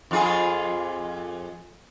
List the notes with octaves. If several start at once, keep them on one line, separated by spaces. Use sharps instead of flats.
F2 F4 G#4